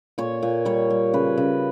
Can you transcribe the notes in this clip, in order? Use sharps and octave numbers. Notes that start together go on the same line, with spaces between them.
A#2 C#5
A#2
G3 C#5
G3
C#3 B4
C#3